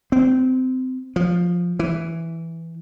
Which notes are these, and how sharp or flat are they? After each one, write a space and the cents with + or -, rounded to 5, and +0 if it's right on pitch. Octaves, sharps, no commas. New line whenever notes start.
C4 -25
F3 +5
E3 +0